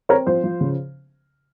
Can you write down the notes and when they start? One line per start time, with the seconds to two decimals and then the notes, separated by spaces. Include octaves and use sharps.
0.09 C4 A#4 C#5
0.27 F3 C5
0.44 F3
0.61 C#3